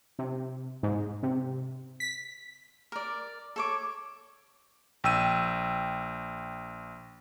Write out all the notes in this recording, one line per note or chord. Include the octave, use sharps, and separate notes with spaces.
C3
G#2
C3
B6
A#4 D5
A4 C#5 D6
A#1 G5 E6 D#7